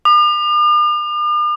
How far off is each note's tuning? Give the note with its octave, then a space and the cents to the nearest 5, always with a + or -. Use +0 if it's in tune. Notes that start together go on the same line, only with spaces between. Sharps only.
D6 +45